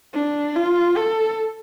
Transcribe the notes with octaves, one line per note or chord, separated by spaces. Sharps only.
D4
F4
A4